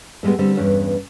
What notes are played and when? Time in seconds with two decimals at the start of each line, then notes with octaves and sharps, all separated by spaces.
0.23 A2 G3 G#3 B3
0.39 D3 G3 C4
0.57 E2 G2 C#4